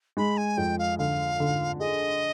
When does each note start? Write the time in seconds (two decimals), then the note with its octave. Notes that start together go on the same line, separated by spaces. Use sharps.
0.17 G#3 B5
0.37 G#5
0.58 F2 G5
0.79 F5
0.99 D3 F5
1.40 D3
1.80 G#4 D#5